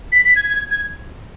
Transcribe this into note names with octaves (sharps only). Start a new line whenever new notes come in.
B6
B6
G#6
G#6
G#6